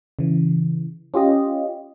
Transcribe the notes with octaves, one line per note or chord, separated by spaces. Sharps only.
C#3 E3
C#4 F4 G4 D#5